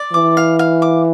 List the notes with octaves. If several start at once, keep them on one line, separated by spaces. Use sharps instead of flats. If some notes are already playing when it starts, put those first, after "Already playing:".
Already playing: D5
E3 D6
F5
F5
D6